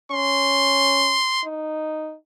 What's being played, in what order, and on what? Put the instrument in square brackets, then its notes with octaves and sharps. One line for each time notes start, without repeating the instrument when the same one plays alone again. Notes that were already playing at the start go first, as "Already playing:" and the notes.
[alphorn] C#4 [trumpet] C6
[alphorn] D#4